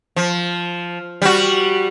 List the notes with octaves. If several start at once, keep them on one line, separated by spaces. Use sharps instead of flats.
F3
G3 F#4